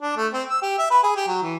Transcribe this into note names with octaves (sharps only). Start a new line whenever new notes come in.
D4
A3
C4
E6
G4
E5
B4
G#4
G4
F#3
E3